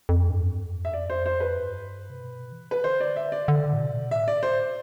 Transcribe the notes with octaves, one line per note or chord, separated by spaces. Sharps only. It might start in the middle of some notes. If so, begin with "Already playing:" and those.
F2
G2
F2
E5
G2
F2 D5
C5
C5
B4
G2
C3
B2
E3
B4
D3 C5
D5
E5
D5
D3
A2
B2
A2 E5
D5
C5